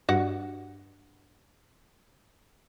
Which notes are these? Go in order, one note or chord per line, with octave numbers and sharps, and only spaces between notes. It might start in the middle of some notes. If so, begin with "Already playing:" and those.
G2 F#4 F#5